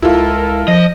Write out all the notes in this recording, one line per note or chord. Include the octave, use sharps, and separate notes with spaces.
C#2 E4 F4 A4 A#4
F3 D#5